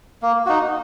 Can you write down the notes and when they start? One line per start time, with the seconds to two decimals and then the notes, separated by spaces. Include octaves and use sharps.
0.22 A#3
0.46 D#4 F#4